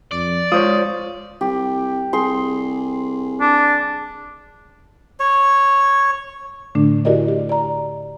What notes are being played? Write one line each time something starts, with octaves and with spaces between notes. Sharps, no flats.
F2 D5
G#3 F4 C5 C#5 D#6
C2 G4
C2 G#4 C6
D4
C#5
A2 D3 A3 D4
E4 F#4 G4 A#4 D5 D#5
G4
D5 A#5